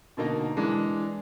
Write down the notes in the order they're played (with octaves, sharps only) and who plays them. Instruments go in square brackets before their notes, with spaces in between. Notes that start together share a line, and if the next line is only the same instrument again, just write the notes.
[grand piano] B2 D3 A#3 D#4
E3 G#3 D4